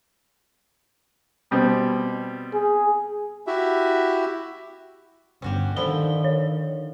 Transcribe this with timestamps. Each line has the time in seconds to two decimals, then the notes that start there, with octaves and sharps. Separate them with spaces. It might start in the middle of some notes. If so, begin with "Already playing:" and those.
1.51 B2 G3 C4
2.53 G#4
3.47 E4 F#4 G4 E5
5.42 G1 C#4 F#4 G4
5.76 D3 D#3 F3 E4 G7
6.24 C#5